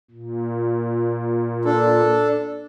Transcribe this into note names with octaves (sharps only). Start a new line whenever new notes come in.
A#2
D4 A4